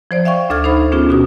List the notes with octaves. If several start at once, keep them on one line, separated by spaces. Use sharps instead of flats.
F3 C5 D5
E5 F5 G5 C#6
D2 D4 A4 F6 G#6
D#4 A4 C5 B5
B3 C#4 D4 F4 G#4
B2 F#4 D#6